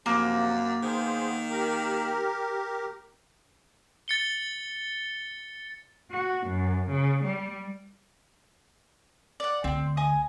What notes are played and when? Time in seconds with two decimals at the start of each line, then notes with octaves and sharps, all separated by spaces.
0.06 F#2 C3 F3 A#3
0.83 D#3 B3 G#4 C5
1.49 G4 A#4
4.08 A6 C#7 G7
6.10 F#4
6.46 F#2
6.89 C#3
7.23 G3
9.40 D5 F#5
9.64 D2 C4
9.97 D#5 G#5 D#6